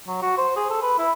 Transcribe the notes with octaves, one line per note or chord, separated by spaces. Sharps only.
F#3
F#4
C5
G#4
A4
B4
E4